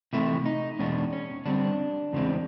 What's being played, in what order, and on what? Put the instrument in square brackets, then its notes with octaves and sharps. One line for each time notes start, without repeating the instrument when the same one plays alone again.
[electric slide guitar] C3 E3 A3 E4
D#4
E2 B2 G#3 C#4 D4
C#4
D3 G3 C4 D4
E2 C#3 E3 G#3 C4